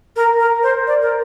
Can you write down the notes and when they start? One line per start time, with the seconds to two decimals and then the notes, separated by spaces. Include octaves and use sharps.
0.16 A#4
0.39 A#4
0.63 C5
0.87 D5
1.02 A#4